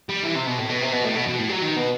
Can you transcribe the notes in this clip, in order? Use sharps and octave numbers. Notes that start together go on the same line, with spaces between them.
G3
E3
C3
B2
A2
B2
C3
B2
A2
B2
B2
A2
F#3
D#3
B2